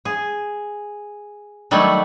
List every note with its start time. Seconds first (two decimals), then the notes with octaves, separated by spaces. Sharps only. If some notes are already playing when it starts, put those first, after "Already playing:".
0.05 G#4
1.71 D#3 F#3 G3 A3